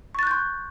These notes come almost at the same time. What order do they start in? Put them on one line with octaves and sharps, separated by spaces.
C#6 A6 F#6 G6 C6